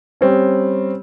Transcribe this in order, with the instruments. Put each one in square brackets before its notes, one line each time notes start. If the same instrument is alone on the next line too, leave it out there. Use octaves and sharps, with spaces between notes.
[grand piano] G3 C4 C#4